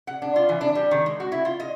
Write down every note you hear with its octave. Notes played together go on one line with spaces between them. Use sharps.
F#5
D4
F4
E3
D4
G3
D#3
G#3
F#4
E4
F4
D#5